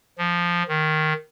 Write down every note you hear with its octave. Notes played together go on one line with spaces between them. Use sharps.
F3
D#3